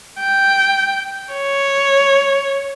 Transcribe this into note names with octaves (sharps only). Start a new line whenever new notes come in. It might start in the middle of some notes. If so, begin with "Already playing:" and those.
G5
C#5